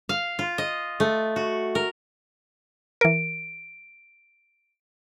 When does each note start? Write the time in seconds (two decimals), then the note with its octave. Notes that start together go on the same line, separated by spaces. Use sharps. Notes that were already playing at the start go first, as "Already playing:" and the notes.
0.09 F5
0.39 F4
0.58 D#5
1.00 A3
1.36 F#4
1.75 A#4
3.01 E3 A#4 D7